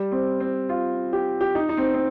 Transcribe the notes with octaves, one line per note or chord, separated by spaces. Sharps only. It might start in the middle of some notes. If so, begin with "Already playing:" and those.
Already playing: G3
C4
C4
F4
G4
G4
D#4
D#4
C4
C4